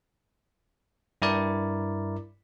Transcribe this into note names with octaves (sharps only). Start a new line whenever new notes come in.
G2 E4 A#4 D5